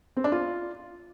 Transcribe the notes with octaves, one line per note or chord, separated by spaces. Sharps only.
C4
D4
F4